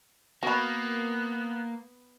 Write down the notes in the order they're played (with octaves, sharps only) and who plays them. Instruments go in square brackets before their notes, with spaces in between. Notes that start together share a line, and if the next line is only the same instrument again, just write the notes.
[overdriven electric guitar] A#3 [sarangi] B3 [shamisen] F#4 B5